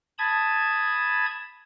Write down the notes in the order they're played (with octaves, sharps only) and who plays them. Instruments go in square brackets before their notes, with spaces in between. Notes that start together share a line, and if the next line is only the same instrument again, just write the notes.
[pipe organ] A5 B5 D#6 G#6